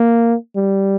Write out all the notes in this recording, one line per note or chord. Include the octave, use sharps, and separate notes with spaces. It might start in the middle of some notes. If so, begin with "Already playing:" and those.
Already playing: A#3
G3